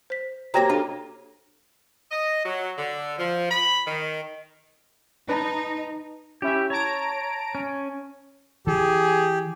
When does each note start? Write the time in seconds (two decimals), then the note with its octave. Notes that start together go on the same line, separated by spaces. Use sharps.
0.10 C5 B6
0.54 A#3 F#4 G4 C5 C#5 G5 A#5 A#6
0.70 D4 F4 A4
2.12 D#5
2.45 F#3
2.78 D3
3.18 F3
3.51 B5
3.87 D#3
5.29 D#4 B4 A5 A#5
6.42 C#4 E4 G4 E5
6.70 C#5 A5 A#5 D7
7.55 C#4
8.67 E3 G4 G#4